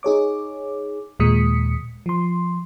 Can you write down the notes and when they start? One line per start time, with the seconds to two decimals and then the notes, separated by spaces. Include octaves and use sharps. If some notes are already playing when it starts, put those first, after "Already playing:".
0.03 D#4 G#4 C#5 D6
1.20 D#2 A#2 G#3 D#6 B6 C#7
2.06 F3 C6